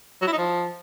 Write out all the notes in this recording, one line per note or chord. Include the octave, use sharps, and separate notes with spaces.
F#3
E4
D#4
F3